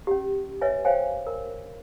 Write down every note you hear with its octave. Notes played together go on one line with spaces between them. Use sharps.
C#4 G4
B4 C#5 D#5 E5 G#5
C5 C#5 F5 G5 G#5
A#4